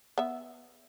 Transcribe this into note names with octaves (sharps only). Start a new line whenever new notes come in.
B3 E5